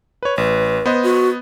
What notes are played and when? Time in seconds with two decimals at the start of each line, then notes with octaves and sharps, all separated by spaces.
0.23 B4 C#5
0.38 A1 B4
0.86 B3 C5 D#5
1.03 F#4